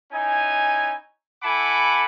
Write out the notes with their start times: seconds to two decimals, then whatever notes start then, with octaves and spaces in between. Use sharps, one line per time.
0.12 C#4 D#4 E4 G#5
1.43 E4 A4 F#5 G#5 B5 D6